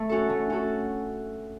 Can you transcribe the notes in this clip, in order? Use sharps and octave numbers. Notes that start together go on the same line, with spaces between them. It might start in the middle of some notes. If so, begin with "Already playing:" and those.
Already playing: A3
C#4 F#4 A4
A3
C#4 F#4 A4